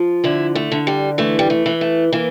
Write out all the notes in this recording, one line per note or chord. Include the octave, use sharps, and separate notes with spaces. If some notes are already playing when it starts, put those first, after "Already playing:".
Already playing: F3
D3 E4
A3
D3
G3
E3 A3
G3
A3
E3
A3
E3 A#3